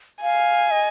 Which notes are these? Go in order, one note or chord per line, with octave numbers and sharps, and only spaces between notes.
F5 G#5
D#5